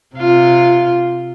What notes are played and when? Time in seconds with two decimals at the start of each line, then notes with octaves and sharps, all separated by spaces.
0.16 C3 F4